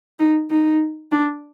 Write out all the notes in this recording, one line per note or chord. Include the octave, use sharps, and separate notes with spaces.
D#4
D#4
D4